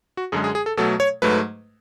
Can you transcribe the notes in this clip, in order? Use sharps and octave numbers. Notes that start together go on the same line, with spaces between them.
F#4
F#2 D3 G#3 G#4
G#4
G#4
A4
B2 F#3 A3 A4
C#5
G#2 F#3 A3 B4